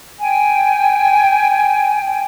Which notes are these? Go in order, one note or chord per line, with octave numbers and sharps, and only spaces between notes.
G5 G#5